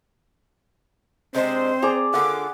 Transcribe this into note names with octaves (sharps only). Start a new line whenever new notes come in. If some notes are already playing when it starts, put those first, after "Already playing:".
C3 G#3 C4 D4 C5
G#4 D5 A#5
D3 A#3 F4 F#5 D6